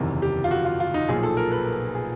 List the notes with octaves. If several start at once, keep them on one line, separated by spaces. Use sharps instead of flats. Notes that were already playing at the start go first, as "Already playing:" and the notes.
Already playing: F#1 E2 C3 D#3
G4
F4
F#4
F4
F4
D#4
B1 A#2 F3 G#4
A4
A#4
B4
A#4
G#4